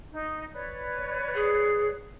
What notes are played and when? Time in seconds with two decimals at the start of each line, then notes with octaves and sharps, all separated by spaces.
0.12 D#4
0.54 B4 C#5 D5
1.35 G#4